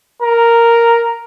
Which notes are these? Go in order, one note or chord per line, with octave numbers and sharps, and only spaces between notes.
A#4